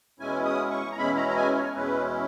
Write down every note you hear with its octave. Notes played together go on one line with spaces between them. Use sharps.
E2 B2 G#3 C#4 E4 G#5
D#6
C#6
A#5
E2 B2 G#3 C#4 E4 B5
A#5
A#5
G#5
C#5
E2 B2 G#3 C#4 E4 B4